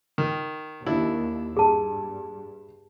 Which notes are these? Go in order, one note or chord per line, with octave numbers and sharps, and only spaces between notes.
D#3
D#2 D4 E4
G2 G#4 A5